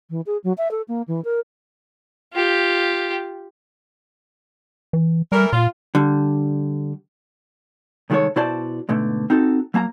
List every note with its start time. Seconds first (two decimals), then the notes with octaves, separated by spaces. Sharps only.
0.10 E3
0.26 G#4
0.44 F#3
0.58 E5
0.71 A4
0.88 A#3
1.08 E3
1.24 A#4
2.34 F4 G4
4.93 E3
5.32 E3 G3 A3 A#4
5.53 A#2 F4
5.95 D3 G3
8.10 C2 D#3 G#3 F#4 A4 C#5
8.36 B2 E4 F#4 C5 D5 A5
8.89 G#2 B2 D3 A3
9.30 C4 D#4 F#4 A4
9.74 F#3 A#3 A5 A#5